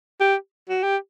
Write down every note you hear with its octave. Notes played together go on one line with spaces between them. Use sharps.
G4
F#4
G4